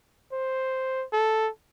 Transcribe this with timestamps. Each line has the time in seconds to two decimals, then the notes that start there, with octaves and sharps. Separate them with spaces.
0.32 C5
1.13 A4